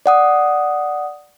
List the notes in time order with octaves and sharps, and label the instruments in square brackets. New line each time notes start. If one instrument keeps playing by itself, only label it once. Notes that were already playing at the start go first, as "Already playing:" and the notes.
[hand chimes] D5 F#5 D#6